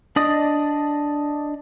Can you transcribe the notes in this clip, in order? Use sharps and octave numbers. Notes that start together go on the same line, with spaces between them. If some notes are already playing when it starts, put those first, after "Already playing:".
D4 D5 D#5 D#6